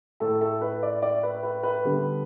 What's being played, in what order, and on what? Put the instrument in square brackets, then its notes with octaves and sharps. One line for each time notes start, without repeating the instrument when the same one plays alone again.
[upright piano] A2 A3 A4
A4
B4
D5
D5
B4
B4
B4
D3 G3 B3